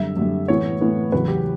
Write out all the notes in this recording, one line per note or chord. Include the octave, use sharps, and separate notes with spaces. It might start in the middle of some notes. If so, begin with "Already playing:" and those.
Already playing: F#2 D3 G3 E5
F#2 D3 G3
A2 E3 B3 C#5
A2 E3 B3
E2 C#3 F#3 B4
G4